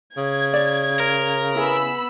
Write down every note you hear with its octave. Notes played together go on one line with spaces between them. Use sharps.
C#3 G#6
D5
A#4
B3 E4 G#4 B5 E6